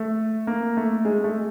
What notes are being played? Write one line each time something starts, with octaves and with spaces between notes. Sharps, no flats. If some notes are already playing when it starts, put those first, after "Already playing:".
Already playing: A3
A#3
A3
G#3
A3